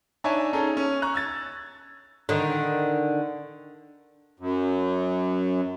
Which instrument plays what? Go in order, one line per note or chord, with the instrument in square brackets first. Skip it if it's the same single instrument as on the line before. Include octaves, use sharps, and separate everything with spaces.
[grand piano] D4 D#4 C#5 E5 G#5 A5
C#4 D#4 G#4 A4
C#4
A#5 C#6 F#6
E6 G#6 A6
[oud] D3 D#3
[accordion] F#2